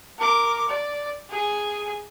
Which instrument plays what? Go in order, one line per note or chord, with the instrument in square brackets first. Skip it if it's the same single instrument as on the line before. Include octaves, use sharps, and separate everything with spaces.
[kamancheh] A#4 D6
D5
G#4 G#5